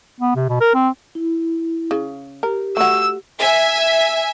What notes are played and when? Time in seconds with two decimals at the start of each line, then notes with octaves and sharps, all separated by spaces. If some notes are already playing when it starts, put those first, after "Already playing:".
0.20 B3
0.36 C3
0.49 B2
0.61 A#4
0.74 C4
1.15 E4
1.91 C#3
2.43 G4 A#4
2.77 A3 F#4 E6
3.39 E5 G#5